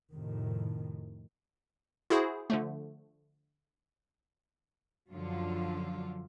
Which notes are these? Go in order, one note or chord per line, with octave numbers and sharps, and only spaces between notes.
F2 A2 C3 D#3
E4 F#4 G#4 C5
D3 F3 A3
F#2 D3 F3 F#3 F4